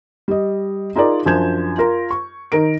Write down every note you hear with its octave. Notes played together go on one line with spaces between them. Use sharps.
G3 D#5
D#4 F4 G#4 A#4 D5
F#2 F3 D4 G6 G#6 E7
F4 A#4
C#6
D#3 A#4 D7